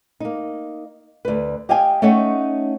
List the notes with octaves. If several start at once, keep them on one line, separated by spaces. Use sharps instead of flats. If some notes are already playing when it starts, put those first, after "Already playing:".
A#3 D#4
D2 B4
G4 D#5 F5 G5 G#5
A3 C#4 D#4 C#5 F#5